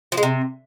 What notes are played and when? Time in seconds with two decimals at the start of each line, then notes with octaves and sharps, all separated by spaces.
0.12 F3
0.17 G#3
0.23 C3